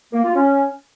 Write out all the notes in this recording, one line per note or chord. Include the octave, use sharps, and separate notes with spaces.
A#3
F4
C#4